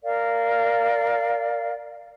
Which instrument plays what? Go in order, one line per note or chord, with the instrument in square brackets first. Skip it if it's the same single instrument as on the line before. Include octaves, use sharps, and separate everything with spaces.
[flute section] A#4 D5 F5